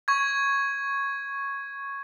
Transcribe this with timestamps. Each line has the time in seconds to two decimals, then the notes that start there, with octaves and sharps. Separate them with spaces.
0.08 C#6 G#6